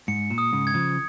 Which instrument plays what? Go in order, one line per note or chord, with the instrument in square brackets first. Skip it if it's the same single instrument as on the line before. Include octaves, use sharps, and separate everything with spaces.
[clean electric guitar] G#2 [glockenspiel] C#7
[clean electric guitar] A#2
[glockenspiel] D#6
[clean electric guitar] G#2 C#3
[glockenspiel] G#6
[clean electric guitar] C#3 F3